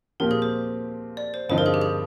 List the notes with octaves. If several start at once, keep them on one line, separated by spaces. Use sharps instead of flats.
A#2 F3 C4 G4 A#4
G#4
C5
D5
C5
G2 D3 F3 C4 D#4 C5
A#4
G#4
G4
G#4